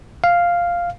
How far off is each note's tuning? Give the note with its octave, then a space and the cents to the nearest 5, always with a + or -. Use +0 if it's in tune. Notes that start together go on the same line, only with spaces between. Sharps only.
F5 +0